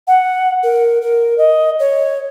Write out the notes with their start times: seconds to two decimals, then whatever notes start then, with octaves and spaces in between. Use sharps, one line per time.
0.07 F#5
0.63 A#4
1.02 A#4
1.38 D#5
1.79 C#5